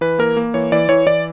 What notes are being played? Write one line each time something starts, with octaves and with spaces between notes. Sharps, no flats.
E3 B4
A#3 A#4
A#3
E3 C#5
E3 D5
E3 C#5
E3 D5